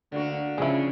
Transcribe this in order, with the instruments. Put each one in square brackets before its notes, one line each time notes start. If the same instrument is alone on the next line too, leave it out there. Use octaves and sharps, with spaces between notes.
[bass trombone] D2 [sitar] D3 A#3 F#4
[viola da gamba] C#3 [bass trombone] F3 [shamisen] G#3 E4